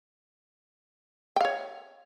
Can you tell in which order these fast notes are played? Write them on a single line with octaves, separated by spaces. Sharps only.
G5 F5 C#5